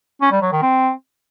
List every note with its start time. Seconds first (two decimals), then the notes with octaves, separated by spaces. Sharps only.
0.22 C#4
0.32 G3
0.42 F#3
0.52 D#3
0.62 C4